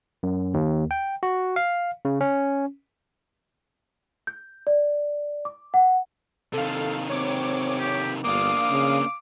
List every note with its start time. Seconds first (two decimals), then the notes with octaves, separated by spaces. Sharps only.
0.23 F#2
0.54 D#2
0.91 G5
1.23 F#4
1.56 F5
2.05 C#3
2.21 C#4
4.27 G6
4.67 D5
5.45 D6
5.74 F#5
6.54 C3 D#3 A4 F5
7.10 C4 C#5 D6
7.78 G4
8.24 G1 A#3 D4 F5 D6 D#6
8.70 C#3